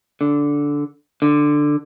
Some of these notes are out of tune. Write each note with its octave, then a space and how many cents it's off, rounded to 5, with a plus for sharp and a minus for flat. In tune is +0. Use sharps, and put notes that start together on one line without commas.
D3 -10
D3 +10